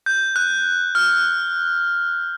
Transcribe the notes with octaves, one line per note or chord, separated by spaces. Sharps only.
G6
F#6
F6